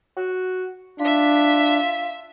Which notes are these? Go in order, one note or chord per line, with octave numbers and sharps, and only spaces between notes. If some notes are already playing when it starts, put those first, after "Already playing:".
F#4
D4 F4 E5 B6